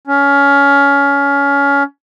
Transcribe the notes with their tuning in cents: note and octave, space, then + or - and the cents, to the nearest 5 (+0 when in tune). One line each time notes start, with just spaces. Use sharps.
C#4 +20